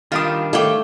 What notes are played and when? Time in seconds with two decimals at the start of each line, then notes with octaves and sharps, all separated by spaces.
0.12 D#3 G3 D4 F4 A#4 F5 D#6
0.53 A3 C#5 F5 G5 D6